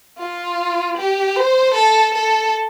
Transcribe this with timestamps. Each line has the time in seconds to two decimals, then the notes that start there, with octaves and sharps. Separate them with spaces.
0.18 F4
0.97 G4
1.36 C5
1.75 A4
2.14 A4